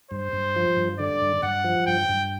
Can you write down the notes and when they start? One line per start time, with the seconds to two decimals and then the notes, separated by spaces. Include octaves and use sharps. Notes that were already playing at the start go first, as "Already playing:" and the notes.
0.11 G2 C5
0.33 G2
0.56 F3
0.77 G2
0.99 D3 D5
1.21 G2
1.43 G2 F#5
1.64 F3
1.87 G2 G5
2.09 G2